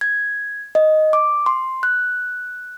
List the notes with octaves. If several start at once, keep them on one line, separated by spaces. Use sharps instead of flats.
G#6
D#5
D6
C6
F#6